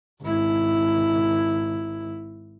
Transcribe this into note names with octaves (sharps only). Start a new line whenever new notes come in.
G#1 E4